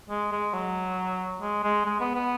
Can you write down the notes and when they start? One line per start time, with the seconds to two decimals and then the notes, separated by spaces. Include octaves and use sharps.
0.09 G#3
0.32 G#3
0.54 F#3
1.41 G#3
1.64 G#3
1.86 G#3
2.00 B3
2.15 B3